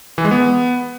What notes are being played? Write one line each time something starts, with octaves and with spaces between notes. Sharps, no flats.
E3
G#3
B3